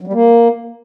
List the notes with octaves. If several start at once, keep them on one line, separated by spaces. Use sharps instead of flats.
F#3
G3
A#3